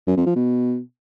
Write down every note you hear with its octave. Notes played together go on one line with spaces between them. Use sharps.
F#2
F2
F3
B2